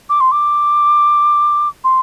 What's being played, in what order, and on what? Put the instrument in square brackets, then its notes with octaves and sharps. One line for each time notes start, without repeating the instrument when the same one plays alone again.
[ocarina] D6
C6
D6
C6